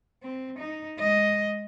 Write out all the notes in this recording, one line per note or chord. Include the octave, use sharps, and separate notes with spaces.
C4
D#4
G#3 D#5